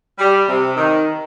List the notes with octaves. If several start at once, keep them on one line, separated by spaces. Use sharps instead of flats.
G3
C3
D#3